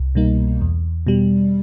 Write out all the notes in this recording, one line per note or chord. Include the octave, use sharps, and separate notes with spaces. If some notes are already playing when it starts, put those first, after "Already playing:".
Already playing: C2
B2 G3 A#3 D#4
E2
B2 G3